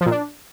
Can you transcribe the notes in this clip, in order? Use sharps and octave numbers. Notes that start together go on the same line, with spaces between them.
F3
A#2
D4